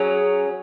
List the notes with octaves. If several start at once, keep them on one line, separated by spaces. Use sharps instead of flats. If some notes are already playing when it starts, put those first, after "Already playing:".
Already playing: F#3 C#4 G#4